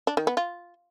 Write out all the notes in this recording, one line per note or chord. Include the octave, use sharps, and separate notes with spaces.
D4
D#3
B3
F4